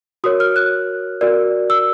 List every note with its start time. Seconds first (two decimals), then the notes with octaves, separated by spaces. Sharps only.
0.24 F#4 A#4 C#5 D#6
0.40 F6
0.56 F#6
1.21 F#4 A#4 D5
1.70 E6